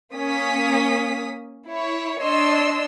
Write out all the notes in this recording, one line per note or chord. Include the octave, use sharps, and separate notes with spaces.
A#3 C#4 D#6 B6
E4 C#5
D4 C#5 D#5 C6 E6